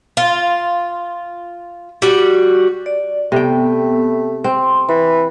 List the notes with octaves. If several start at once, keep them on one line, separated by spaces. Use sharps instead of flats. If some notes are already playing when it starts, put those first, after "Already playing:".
F4
G3 F#4
D5
C3 A3 B3 G5
C4 C5 C6
E3 B5